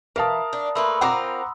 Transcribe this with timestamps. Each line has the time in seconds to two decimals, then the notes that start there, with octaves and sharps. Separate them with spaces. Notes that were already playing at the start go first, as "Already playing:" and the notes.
0.16 E3 A#4 F5 A5 A#5 D#6
0.53 D4
0.75 A3 A#3 B4 B5 C6 E6
1.01 C4 F4 A#4 F#5 A#5 D6